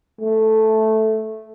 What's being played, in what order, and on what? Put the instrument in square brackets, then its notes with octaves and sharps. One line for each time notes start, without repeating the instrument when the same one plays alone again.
[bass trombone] A3